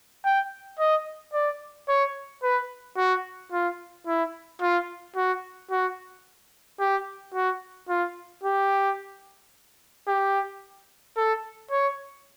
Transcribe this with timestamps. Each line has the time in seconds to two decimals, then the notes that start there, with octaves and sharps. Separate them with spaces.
0.25 G5
0.79 D#5
1.33 D5
1.88 C#5
2.43 B4
2.97 F#4
3.52 F4
4.07 E4
4.61 F4
5.16 F#4
5.71 F#4
6.80 G4
7.34 F#4
7.89 F4
8.43 G4
10.08 G4
11.17 A4
11.71 C#5